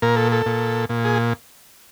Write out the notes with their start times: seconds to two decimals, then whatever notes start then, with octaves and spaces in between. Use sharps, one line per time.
0.02 A#2 A#4
0.16 A4
0.32 A4
0.46 A#2
0.89 A#2
1.05 G#4